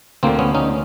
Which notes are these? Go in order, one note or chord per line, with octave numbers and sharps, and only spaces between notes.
D2 D3 A#3 C4
B3 C#4
C#4 D#4